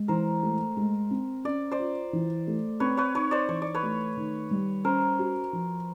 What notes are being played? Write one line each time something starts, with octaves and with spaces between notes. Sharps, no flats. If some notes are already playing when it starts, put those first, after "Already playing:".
Already playing: G#3
E3 A#4 C5
A3
G#3
C4
C#4 D5
C5 D5
F4
E3
A3
C4 B4 C#5
B4 C#5
D#4 B4 C#5
C5 D5
E3 C#5
D5
B4 C#5
A3
D#3
G3
C#4 A#4 C5
F#4
F3